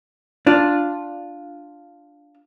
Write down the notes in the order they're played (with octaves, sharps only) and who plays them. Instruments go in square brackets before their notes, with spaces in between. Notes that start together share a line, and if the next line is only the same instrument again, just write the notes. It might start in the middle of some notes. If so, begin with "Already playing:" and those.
[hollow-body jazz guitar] D4 F4 D5